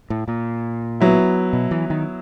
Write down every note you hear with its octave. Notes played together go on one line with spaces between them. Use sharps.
A2
A#2
F#3 B3 E4
B2
E3
D#3